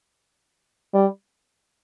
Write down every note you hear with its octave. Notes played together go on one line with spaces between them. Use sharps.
G3